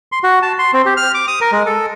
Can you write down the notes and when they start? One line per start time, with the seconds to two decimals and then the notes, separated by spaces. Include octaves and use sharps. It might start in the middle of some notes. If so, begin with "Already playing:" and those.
0.12 C6
0.24 F#4
0.42 A5
0.59 C6
0.73 C4
0.86 G4
0.97 F6
1.14 D6
1.28 D#6
1.41 A#4
1.52 G#3
1.66 A4